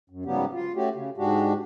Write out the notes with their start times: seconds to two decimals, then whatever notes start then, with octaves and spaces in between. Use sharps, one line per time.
0.10 F#2
0.25 G#2 C#3 F#3 G3 B3 G4
0.53 F4
0.76 A3 C#4 F#4 G4
0.95 C#3
1.17 G#2 G#3 D4 F#4 G4